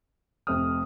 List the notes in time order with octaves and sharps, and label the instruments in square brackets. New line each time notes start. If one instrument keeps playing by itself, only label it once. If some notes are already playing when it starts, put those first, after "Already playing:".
[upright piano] F1 F2 C3 D#6 F6